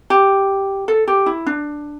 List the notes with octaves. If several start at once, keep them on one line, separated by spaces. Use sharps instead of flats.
G4
A4
G4
E4
D4